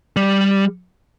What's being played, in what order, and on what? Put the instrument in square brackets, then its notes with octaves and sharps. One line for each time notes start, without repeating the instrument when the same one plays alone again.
[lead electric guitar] G3